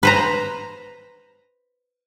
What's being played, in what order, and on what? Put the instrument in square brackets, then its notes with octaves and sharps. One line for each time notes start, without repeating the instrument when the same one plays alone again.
[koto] B4 C5 A#5